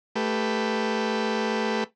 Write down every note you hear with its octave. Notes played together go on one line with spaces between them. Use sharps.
A3 G4 B4